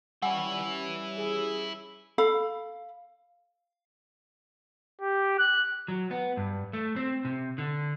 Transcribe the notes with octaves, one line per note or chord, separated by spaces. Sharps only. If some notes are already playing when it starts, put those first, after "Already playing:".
G3 C#4 E4 B4 F#5 G#5
G#4
A4 F5 B5
G4
F#6
F#3
B3
G2
A3
C4
C3
D3